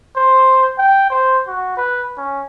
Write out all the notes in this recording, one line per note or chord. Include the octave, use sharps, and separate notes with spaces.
C5
G5
C5
F#4
B4
C#4